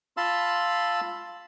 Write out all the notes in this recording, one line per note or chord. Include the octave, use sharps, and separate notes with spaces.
F4 F5 A5 B5 C6 E6